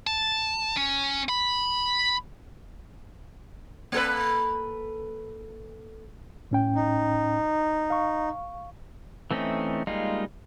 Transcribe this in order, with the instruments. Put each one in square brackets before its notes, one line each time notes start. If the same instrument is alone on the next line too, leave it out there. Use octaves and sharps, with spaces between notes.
[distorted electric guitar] A5
C#4
B5
[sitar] A#3 A4 B4
[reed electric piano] A2 C#4 G5
[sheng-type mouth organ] D#4
[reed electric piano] F5 C#6
[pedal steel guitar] E3 A3 C4 C#4 D#4
G3 G#3 A#3 D#4 F4